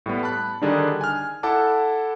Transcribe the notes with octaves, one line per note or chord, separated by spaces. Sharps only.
A2 G3 B3
A5 B5 F#6
D3 D#3 G3 D4 D#4 G#4
G#5 F6
E4 A4 F#5 A5 D6